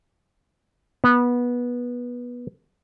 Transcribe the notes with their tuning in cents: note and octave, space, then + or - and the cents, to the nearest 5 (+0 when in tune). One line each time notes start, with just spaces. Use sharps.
B3 -20